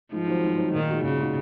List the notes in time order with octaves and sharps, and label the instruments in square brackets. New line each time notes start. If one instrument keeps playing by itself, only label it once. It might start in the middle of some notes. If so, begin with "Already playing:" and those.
[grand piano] G#2 [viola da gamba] F3
[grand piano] D#3 F#3 C4
G#2
D#3 F#3 C4
[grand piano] A#2 [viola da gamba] D#3
[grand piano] G#3 D#4 F#4
[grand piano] A#2 [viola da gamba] C#3
[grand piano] G#3 D#4 F#4